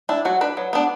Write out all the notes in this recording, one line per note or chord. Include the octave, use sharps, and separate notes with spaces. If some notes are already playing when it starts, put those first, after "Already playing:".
D4 E4
F#3 F#4
D4 B4
F#3
B3 D4